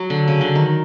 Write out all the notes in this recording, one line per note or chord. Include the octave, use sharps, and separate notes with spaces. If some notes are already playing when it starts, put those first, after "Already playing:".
Already playing: F#3
D3
C#3
D3
D#3